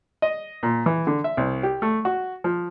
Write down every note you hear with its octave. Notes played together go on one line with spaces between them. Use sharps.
D#5
A#2
E3
D3
E5
C2
G4
A3
F#4
F3